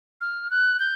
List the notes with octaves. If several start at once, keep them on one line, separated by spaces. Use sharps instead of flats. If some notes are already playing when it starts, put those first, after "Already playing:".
F6
F#6
G6